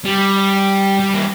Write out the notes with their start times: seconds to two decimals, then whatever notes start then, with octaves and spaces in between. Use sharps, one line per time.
0.05 G3
0.99 G3
1.14 A#3